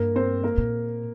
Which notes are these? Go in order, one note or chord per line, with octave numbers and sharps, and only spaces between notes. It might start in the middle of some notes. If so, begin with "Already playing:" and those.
Already playing: G2 A#3 A#4
C4 C5
A#3 A#4
A#2